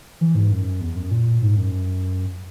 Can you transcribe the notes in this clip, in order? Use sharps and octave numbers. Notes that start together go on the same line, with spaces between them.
E3
G#2
F#2
E2
F#2
A#2
G#2
F#2